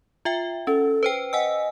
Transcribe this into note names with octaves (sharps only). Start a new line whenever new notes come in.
F4 E5 G5
C#4 A4
B4 C5 G5
D#5 F#5 G#5 E6